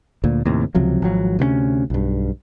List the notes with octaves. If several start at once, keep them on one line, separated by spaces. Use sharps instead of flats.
D2 A#2
D#2 A2 C3
C#2 C3 F3 F#3
G#1 F3 F#3
D2 C3 A3 C#4
B1 G2